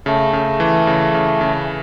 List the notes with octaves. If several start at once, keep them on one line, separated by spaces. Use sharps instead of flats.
C#3 A3
C#3
E3
C#3
C#3
C#3